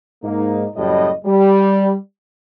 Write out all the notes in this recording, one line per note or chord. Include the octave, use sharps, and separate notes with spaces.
G#2 A#3 D#4
F#1 F#2 A2 G3 D#5
G3